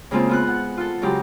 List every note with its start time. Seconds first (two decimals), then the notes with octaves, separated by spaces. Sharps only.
0.11 C#3 G#3 A#3 C4 F4
0.29 B3 F4 F#6
0.47 F#5
0.77 F4 A4
1.02 C#3 F#3 G#3 G4